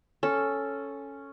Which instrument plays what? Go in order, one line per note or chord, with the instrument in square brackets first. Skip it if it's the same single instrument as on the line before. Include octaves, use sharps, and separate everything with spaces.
[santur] C#4 [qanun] A4